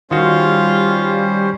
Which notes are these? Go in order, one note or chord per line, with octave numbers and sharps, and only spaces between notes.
D#3 G3 C#4 F4 F#4 C5